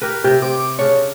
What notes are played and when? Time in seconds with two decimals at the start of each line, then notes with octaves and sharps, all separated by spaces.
0.01 G4 A#4 B4
0.24 C3 G4
0.42 C4 D6
0.79 C#3 D4 C#5